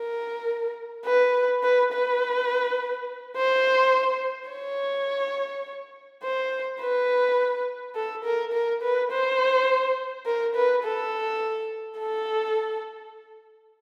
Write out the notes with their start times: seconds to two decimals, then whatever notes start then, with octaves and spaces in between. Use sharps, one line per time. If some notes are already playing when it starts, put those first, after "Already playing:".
Already playing: A#4
1.05 B4
1.63 B4
1.93 B4
3.37 C5
4.50 C#5
6.23 C5
6.80 B4
7.95 A4
8.24 A#4
8.53 A#4
8.82 B4
9.11 C5
10.26 A#4
10.55 B4
10.84 A4
11.99 A4